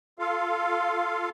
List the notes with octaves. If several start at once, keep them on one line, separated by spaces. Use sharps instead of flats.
F4 A4 F5